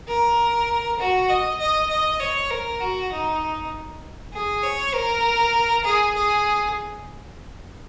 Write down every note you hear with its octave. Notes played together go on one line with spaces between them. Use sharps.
A#4
F#4
D#5
D#5
D#5
C#5
A#4
F#4
D#4
G#4
C#5
A#4
G#4
G#4